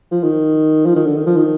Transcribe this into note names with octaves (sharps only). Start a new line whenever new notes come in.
F3
D#3
F3
D#3
D3
D#3
F3
D#3